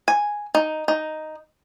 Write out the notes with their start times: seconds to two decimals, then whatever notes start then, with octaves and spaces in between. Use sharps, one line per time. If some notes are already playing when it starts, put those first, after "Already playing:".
0.08 G#5
0.55 D#4
0.88 D#4